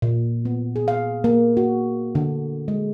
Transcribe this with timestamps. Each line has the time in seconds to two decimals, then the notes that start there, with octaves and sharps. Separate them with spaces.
0.02 A#2
0.45 B3
0.76 G#4
0.88 F5
1.24 A#3
1.57 F#4
2.15 D3
2.68 G#3